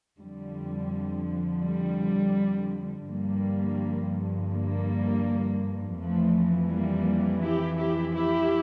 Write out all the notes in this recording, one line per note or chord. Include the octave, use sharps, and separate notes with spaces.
F2 D3 F3 G3
G3
G2 D3 F3 G3 A#3
G3 A#3
F2 E3 F3 A3
G3 A#3
E4 G4
E4 G4
E4 G4